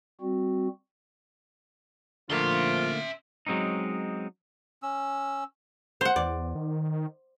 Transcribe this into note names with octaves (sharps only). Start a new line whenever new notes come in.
G3 C4 F#4
A#1 D3 F3 A3 A#3 F4 E5 C6
F#3 G#3 C4 C#4 D#4
C#4 E6
C5 F#5
E2 D5
D#3